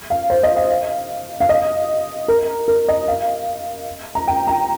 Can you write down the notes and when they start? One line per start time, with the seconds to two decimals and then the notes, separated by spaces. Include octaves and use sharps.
0.10 F5
0.30 C5
0.43 D#5
0.56 F5
1.40 F5
1.49 D#5
2.28 A#4
2.68 A#4
2.88 D#5
3.08 F5
4.15 A#5
4.27 G5
4.47 A#5